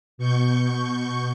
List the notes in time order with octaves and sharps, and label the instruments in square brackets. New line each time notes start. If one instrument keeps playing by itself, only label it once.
[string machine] B2 C#6 G6